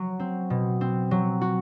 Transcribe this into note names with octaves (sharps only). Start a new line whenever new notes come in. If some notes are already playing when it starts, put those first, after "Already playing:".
Already playing: F#3
C4
B2
C4
F#3
F#4